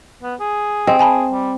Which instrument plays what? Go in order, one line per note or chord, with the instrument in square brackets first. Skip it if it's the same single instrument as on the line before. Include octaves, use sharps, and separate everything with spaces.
[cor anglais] B3
G#4
[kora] C4 [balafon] D#5
[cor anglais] G#4 [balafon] G#5 A5 B5
[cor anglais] G3